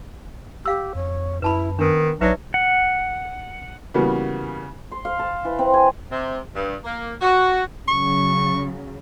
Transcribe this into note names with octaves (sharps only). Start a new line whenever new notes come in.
G4 F5 E6
F2 C#5
F#2 E4 B4 A5 B5
D#3 B3 D4 A#4
A#1 F#3 D#4 B4 D5 E5
F#5
C#3 E3 G3 A#3 B3 F#4
C6
F5
A5
E3
C4
G#5
C3
G2
A#3
F#4
C#3 F#3 C#6